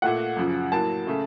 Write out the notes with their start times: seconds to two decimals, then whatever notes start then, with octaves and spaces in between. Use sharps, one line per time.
0.02 A#2 A3 F#5
0.37 F#2 C#3 F3
0.72 A2 F#3 A#3 A5
1.07 C#3 A3